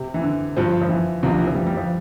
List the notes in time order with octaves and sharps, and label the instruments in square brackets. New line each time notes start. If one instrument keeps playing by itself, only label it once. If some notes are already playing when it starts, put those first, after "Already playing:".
Already playing: [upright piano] C3
E3
D3
[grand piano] G2 F3 C4
[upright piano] F3
E3
[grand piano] C2 C3 F3
[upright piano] D3
E3
F3
G3
G3
F3